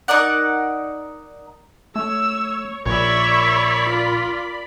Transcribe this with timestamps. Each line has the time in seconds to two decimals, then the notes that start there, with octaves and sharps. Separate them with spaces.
0.08 D#4 A#4 D5 F#5
1.96 A3 C#5 E6
2.86 A#1 A#2 A#4 C#5 D5 E5 B5
3.90 F4